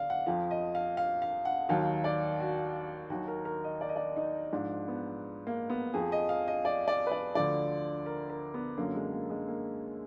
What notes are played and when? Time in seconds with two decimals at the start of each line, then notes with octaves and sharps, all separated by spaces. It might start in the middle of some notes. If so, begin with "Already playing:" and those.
Already playing: D2 D5 F5
0.10 F#5
0.26 F2 F3 F5
0.51 D#5
0.75 F5
0.97 F5
1.22 F5
1.45 F#5
1.69 D#2 D#3 F#3 F5
2.04 D5
2.40 F#4
3.10 D#2 D#3 F#3 F#4
3.28 A#4
3.45 A#4
3.64 D#5
3.81 D5
3.89 D#5
3.96 D5
4.16 D#4
4.53 G#2 F3 D4
4.88 B3
5.47 A#3
5.70 B3
5.94 F2 F3 G#4
6.12 D#5
6.29 F5
6.48 D#5
6.65 D5
6.88 D5
7.07 B4
7.12 D5
7.35 D2 D3 F3 D5
8.06 A#4
8.30 A#4
8.54 B3
8.78 F#2 D3 F#3 A#3
8.95 G#3
9.13 A#3
9.30 G#3
9.48 A#3